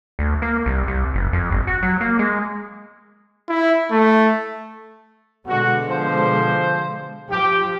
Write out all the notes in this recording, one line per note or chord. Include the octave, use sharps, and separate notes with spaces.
D2
A#3
C2
C2
F#1
F2
G1
F#4
F#3
A#3
G#3
E4
A3
B2 D3 G#3 F#4
F3 C5
F3 G4